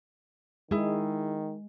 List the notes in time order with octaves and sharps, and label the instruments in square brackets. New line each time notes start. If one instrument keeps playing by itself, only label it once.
[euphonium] D#3 [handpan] G#3 [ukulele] E4 G#4